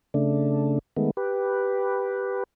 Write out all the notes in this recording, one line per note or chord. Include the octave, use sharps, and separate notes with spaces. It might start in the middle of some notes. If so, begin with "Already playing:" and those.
C#3 A3 D4
D#3 G#3 A3 B3
G4 B4